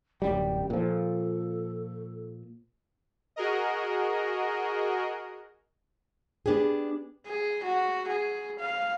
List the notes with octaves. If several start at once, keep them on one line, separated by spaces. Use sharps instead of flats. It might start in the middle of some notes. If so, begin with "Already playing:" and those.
D1 F#2 G3 G5
A#2 F3 A4
F#4 G#4 A#4 D#5
B3 D4 G4 G#4
G#4
F#4
G#4
F5